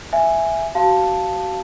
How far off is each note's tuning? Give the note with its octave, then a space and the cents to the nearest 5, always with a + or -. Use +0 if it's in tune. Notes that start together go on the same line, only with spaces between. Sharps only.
E5 +5 G#5 +0
F#4 +35 F5 +0 A5 +0